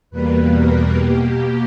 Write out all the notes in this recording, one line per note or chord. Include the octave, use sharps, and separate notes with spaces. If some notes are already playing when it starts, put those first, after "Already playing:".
E2 B2 G3 A#3 B4
A#4
B2 A#3 G4